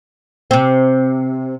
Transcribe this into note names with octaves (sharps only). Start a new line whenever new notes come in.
C3 C4